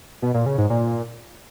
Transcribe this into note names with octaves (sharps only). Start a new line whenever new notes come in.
B2
A#2
C#3
G#2
A#2